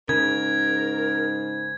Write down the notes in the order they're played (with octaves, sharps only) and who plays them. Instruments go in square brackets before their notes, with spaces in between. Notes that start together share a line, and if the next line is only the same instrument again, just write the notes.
[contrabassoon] G#2 [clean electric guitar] C#3 [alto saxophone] A#4 [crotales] G#6